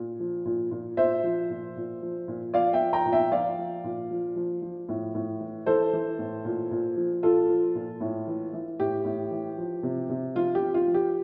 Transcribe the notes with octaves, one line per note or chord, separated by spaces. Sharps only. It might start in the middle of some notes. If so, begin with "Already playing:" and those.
Already playing: A#2
F3
A#2
A#2
A#2 C5 E5
F3
A#2
A#2
F3
A#2
F3 D5 F5
E5 G5
F3
G5 A#5
A#2
E5 G5
F3 D5 F5
F3
A#2
F3
F3
F3
A2
A2
E3
E3 A4 C5
E3
A2
A#2
A#2
F3
A#2 F4 A4
F3
A#2
A2
E3
E3
A2 G4
A2
E3
F3
C3
C3
F3 F4
G4
F3
F4
F3
G4